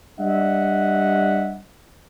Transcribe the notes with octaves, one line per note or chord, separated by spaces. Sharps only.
G3 D4 D#5 E5 F#5